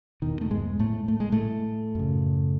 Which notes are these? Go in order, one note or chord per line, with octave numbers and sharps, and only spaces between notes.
E2 B2 D#3
A3
G#2 G#3
A2 A3
A3
G#3
A2 A3
F#2 C#3